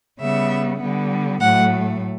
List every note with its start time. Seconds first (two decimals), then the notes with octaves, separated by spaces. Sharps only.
0.20 C#3 G3 B3 E5
0.80 D3 G3 B3
1.40 A2 F#3 A3 F#5